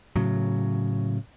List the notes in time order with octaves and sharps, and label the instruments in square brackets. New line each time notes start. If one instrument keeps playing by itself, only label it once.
[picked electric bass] A2 C#3 F#3